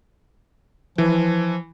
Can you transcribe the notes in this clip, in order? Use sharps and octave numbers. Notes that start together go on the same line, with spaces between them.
E3 F3